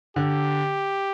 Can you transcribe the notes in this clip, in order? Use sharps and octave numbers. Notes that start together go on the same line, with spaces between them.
D3 G4